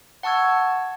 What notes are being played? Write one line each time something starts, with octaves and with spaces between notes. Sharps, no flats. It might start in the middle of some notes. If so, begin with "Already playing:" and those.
F#5 A5 C#6 E6 G#6